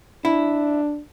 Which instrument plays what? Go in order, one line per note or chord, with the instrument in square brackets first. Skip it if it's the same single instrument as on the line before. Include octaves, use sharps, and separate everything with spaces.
[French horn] D4 [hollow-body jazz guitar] E4